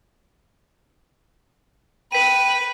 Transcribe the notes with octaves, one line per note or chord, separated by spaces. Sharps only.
B4 G5 B6 D#7